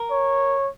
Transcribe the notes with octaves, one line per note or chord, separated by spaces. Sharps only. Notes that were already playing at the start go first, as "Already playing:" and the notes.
Already playing: A#4
C#5